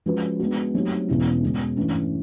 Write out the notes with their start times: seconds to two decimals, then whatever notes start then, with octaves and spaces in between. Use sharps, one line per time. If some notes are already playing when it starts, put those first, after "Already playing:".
0.06 F3 G#3 C#4 F#4 B4
0.39 G#3 B3 D4 F#4
0.75 F#3 A3 C4 D#4 G4
1.08 E2 B2 G#3 C#4 E4
1.43 B2 G#3 C#4
1.77 G2 E3 A3 C#4